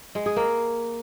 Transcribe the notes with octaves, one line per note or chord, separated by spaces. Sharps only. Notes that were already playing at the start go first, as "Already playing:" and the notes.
G#3
G#4
A#3